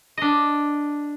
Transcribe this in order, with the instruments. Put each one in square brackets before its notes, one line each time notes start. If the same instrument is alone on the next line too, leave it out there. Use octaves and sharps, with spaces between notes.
[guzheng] D4 D#5